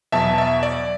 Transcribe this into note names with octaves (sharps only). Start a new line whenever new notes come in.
E2 B2 F#3 E5 A5
E5
D5